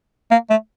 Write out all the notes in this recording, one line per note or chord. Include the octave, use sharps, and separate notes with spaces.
A#3
A3